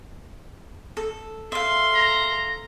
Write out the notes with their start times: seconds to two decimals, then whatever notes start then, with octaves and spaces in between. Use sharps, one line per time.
0.97 A4
1.52 A4 E5 F5 C6
1.94 A#5